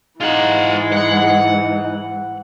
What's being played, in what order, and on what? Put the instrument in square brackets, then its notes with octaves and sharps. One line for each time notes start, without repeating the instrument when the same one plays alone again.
[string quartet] G#2 E3 [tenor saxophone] G#3 [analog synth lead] D#4 [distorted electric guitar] F4 F#5
[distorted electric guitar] F#5